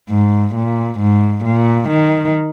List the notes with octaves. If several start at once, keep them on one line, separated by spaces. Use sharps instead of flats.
G#2
A#2
G#2
A#2
D#3